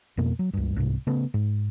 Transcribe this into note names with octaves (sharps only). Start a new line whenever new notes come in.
F2 B2 A#3
F#3
C#2 G2
C2 G#2 C3
C#3 A3 B3
G#2